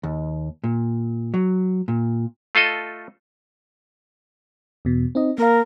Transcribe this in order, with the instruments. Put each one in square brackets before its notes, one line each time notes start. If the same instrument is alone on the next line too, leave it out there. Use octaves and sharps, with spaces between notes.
[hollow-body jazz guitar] D#2
A#2
F#3
A#2
[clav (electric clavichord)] A3 F4 A4 D#5
[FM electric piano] E2 B2
C4 D#4 D#5
[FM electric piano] A#3 F5 [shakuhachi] A#4